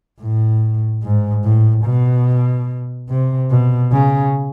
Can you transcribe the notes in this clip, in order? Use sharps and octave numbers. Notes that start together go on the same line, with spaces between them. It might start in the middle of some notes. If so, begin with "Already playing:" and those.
A2
G#2
A2
B2
C3
B2
C#3